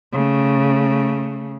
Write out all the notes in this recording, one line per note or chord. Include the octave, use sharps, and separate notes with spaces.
C#3 A3